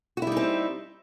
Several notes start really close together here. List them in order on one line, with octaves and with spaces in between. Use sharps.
F#4 E4 G3 D#4 C4